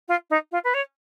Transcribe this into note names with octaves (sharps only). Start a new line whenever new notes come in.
F4
D#4
F4
B4
C#5